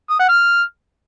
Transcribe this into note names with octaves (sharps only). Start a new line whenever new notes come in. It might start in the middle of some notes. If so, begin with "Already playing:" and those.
D#6
F#5
F6